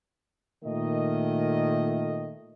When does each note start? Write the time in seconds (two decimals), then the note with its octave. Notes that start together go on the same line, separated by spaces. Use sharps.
0.64 A#2 D#3 A3 D#5